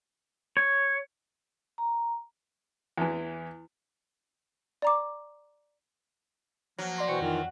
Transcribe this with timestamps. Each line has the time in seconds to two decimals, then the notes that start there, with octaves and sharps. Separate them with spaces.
0.57 C#5
1.78 A#5
2.98 E2 E3
4.82 D5 A#5 D6
6.79 F3 F#3 A#3
6.96 D5 C6 A#6
7.08 B2 E3 C5 G5 C#6
7.20 F2 D#3 E3 F4 F6